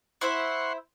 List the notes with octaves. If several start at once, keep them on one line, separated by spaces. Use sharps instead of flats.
E4 C5 E5 F#5 C6 C#6